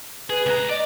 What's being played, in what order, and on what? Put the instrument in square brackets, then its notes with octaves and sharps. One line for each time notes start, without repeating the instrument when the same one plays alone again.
[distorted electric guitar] G#4 [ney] B4
[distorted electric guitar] C#2 A#5
[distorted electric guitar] D5 [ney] D#5